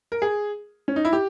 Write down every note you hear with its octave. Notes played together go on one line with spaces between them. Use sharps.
A#4
G#4
C#4
D#4
E4
G4